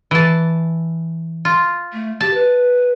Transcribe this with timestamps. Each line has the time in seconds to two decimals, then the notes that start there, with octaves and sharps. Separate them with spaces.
0.11 E3 A5
1.45 F4
1.93 A3
2.20 G4 A5
2.34 B4